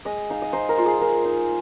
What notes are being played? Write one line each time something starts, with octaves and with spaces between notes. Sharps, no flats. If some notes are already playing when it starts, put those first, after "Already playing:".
G#3 D#5
D#4 F5
D#5
D#4 C5
A#4
G#3 F4
G#4
G#3 A#4
D#4